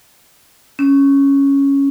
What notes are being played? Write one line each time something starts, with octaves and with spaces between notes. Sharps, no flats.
C#4